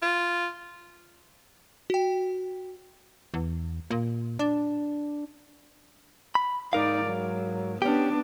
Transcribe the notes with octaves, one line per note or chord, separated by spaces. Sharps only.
F4
F#4 G5
E2
A#2
D4
B5
G#2 D#4 A#4 D5 F5
F#3
B3 C#4 D4 G4